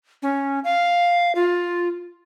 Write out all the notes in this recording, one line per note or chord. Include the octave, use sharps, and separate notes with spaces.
C#4
F5
F4